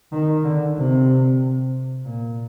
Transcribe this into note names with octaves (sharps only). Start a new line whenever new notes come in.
D#3
D3
C3
A#2